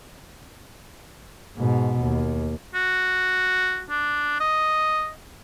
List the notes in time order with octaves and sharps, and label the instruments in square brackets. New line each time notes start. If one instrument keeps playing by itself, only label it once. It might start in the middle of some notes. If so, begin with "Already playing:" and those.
[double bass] G#2 B2
D#2
[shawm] F#4
D4
D#5